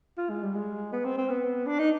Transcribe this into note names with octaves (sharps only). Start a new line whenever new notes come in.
F4
G#3
G3
G#3
B3
C4
C4
B3
D4
D#4